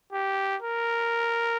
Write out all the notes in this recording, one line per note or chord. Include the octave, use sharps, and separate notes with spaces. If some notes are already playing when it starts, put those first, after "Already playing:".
G4
A#4